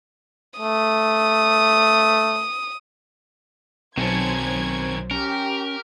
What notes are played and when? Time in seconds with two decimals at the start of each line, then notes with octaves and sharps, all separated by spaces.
0.59 A3 D#6
3.97 B1 D#3 F#3 C4 C#4 C5 A5 G#6
5.11 C#4 G4 A#4